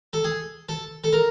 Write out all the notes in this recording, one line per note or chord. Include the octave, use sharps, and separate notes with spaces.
A4
G#4
A4
A4
A#4